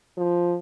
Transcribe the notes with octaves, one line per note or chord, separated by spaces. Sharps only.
F3